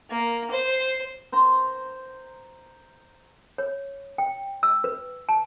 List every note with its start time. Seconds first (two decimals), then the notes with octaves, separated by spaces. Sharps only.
0.10 A#3
0.51 C5
1.32 C5 A#5 C6
3.58 C#5
4.18 G5
4.63 E6
4.84 B4
5.29 A5